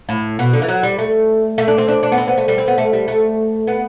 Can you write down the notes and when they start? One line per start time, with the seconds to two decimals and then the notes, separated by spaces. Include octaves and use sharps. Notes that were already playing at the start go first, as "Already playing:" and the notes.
0.09 A2
0.39 B2
0.53 D3
0.62 E3
0.68 F#3
0.83 G3
0.98 A3
1.58 A3
1.68 D4
1.78 C4
1.88 D4
2.03 D4
2.12 B3
2.18 C4
2.28 B3
2.38 A3
2.48 G3
2.58 C4
2.68 B3
2.78 A3
2.93 G3
3.08 A3
3.67 B3